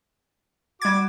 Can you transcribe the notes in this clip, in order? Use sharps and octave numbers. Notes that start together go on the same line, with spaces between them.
G3 F#4 D6 G#6